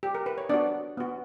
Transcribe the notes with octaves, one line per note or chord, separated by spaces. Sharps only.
G4
A#4
B4
C#5
B3 D4 F#4 D5
B3 F#4